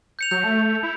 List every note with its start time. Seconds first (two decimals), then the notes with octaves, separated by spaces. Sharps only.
0.19 G6 C#7 F7
0.31 F#3 G6
0.44 A3
0.83 E4